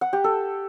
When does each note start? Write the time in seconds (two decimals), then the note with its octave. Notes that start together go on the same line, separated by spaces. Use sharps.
0.01 F#5
0.13 G4
0.24 A4